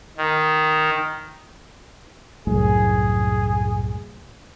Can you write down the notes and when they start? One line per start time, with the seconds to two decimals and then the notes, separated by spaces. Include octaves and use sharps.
0.17 D#3
2.47 C2 F#2 A2 G#4